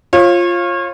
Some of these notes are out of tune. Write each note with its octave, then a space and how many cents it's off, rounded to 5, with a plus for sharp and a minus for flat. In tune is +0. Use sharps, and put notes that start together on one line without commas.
F4 +0 C#5 -35